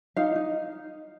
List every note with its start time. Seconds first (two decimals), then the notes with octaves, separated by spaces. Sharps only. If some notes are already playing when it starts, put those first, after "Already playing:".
0.16 D#4 F5
0.35 D#4